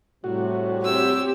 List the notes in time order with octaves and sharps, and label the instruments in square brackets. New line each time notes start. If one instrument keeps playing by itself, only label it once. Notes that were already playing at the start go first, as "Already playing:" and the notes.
[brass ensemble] A2 C3 G3 [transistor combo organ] F#4
[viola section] C4 G4 [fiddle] C#5 E6